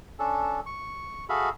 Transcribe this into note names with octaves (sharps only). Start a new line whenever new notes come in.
C#4 D4 A4
C#6
F#4 G#4 A4 E5 F5 B5